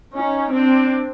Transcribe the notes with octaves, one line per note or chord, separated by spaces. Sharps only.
C#4 D#4
C4 D4